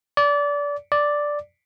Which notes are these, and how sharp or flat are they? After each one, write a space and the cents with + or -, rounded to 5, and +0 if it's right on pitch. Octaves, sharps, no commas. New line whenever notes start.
D5 -25
D5 +0